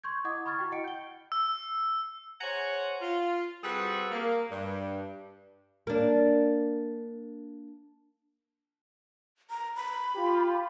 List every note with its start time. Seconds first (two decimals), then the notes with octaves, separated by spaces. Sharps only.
0.04 C6 C#6 G6 G#6
0.25 E4 D#5 F#5 D6 D#6 G#6
0.46 B5 C#6 F6 G#6 A6
0.58 E4 F#4 G5
0.72 D#5 F#5 G5 C#7 D7
0.84 G6 G7
1.32 E6
2.41 G#4 C5 C#5 F#5 G#5 A#5
3.01 F4
3.64 G3 C4 F#4 G#4 A4 B4
4.11 A#3
4.51 G2
5.87 A#3 D4
9.50 A#5
9.76 B5
10.14 F4 G4